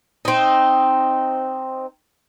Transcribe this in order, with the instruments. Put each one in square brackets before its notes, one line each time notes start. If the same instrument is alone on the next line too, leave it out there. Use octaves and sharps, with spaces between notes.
[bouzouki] C4 D#4